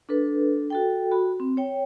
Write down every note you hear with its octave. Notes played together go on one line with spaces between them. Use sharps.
D4 A4 B4
F#4 A4 G5
F#4 B5
C4
C#5 G5